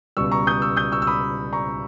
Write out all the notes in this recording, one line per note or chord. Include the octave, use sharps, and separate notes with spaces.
C#2 B2 G3 C#6 E6
A#5 C#6
D#6 G6
C#6 E6
D#6 G6
C#6 E6
E6
B5 D#6
A#5 C#6